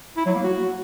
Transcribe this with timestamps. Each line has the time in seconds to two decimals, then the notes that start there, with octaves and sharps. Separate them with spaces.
0.17 E4
0.26 F#3
0.35 A#3
0.44 F#4